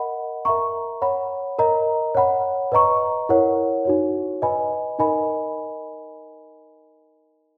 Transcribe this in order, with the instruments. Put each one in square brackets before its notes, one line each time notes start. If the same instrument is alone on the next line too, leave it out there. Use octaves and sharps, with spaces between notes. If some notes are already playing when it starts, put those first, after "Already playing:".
Already playing: [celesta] A#4 D#5 F#5 B5
A#4 E5 A#5 C#6
C#5 F#5 B5
A#4 D#5 A#5
C#5 F#5 B5
B4 D#5 A#5 C#6
E4 A#4 C#5 F#5
D#4 F#4 C#5
B4 D#5 G#5 B5
D#4 A#4 D#5 G#5 B5